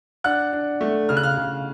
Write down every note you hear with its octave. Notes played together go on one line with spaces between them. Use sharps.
D4 F#5 F#6
D4
A3
C#3 F6
F#6
F5 F6
C#3